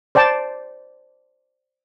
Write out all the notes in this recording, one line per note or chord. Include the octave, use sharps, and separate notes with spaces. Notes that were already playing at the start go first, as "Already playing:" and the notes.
C5 D5 G5 A5